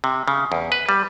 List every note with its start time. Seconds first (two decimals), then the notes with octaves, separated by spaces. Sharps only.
0.04 C3
0.28 C#3
0.52 E2
0.72 B4
0.89 G3